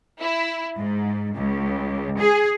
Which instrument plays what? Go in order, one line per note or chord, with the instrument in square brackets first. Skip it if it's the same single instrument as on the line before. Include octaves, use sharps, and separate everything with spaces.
[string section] E4
G#2
C#2
G#4